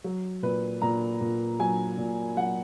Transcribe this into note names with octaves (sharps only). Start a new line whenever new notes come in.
F#3
A#2 B4
A#2 A#5
A#2
F#3 G#5
A#2
F#3 F#5